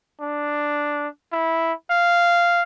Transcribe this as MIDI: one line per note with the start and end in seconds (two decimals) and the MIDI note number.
0.21 1.08 62
1.33 1.73 64
1.91 2.62 77